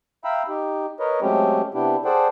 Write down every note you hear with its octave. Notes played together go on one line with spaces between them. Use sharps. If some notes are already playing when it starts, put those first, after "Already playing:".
E5 F5 G5 A#5 B5 E6
D#4 G4
A#4 B4 C#5 D#5
F#3 G#3 A3 C4 C#4 G4
C3 B3 D4 E4 G4
G#4 A4 C5 D5 F#5 G5